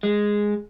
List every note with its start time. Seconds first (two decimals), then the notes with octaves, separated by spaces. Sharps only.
0.03 G#3